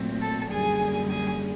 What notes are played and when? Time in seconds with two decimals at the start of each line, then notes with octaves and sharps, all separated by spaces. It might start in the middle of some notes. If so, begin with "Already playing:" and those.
Already playing: A#2 F#3 A3 C4
0.21 A4 A5
0.50 F#2 D3 G3 A#3 G#4 G#5
1.09 G#4 G#5